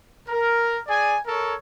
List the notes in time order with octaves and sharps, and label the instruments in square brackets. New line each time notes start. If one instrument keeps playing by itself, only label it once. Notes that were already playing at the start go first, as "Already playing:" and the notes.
[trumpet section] A#4
G#4 D5 G#5
A4 A#4 C#5